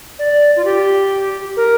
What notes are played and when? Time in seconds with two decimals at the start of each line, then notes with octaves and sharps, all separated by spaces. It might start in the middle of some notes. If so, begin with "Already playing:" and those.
0.19 D5
0.56 F4
0.65 G4
1.57 A#4